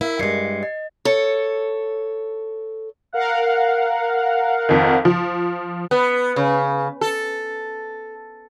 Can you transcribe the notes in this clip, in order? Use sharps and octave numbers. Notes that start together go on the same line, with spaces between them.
E4 A#4 F5
G2 G#3 G#6 C7 C#7
D#5
A4 C#5
A#4 F5 F#5
F2 D#3
F3
B3
C#3
A4